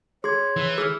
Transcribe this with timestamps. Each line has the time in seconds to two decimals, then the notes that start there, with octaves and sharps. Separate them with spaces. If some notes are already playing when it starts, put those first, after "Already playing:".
0.24 G#4 C#5 C6 G#6
0.56 E3
0.78 G#4 E6 F6